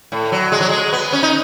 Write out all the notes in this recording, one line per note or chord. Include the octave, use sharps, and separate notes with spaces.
A2
F#3
G#3
F#3
G#3
B3
C#4
D#4